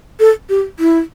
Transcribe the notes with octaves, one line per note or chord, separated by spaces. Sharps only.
A4
G4
E4